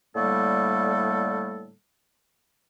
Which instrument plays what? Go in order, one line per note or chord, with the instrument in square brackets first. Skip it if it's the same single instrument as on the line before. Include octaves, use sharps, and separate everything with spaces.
[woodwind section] A2 D3 G3 A3 A#3 A4